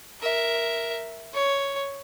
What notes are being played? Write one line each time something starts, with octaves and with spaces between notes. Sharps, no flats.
A#4 E5
C#5